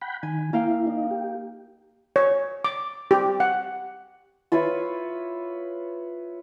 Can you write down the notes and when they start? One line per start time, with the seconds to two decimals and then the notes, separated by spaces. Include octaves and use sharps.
0.02 F#5 G5 B5
0.23 D#3 G#5
0.53 A#3 E4 F5 G5
0.87 D#4
1.11 G4
2.16 C#5
2.64 D6
3.11 G4
3.40 F#5
4.52 F4 B4 C#5 E5